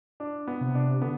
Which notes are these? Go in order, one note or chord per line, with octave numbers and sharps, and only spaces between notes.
D4
B3
C3
D4
D3 B3